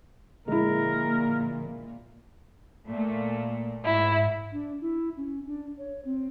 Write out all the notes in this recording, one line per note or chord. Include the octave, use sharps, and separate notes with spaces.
A#2 D3 F3 G#3 A#3 E4 A#4
A#2 A3
G#2 E4
D4
E4
C#4
D4
C#5
C4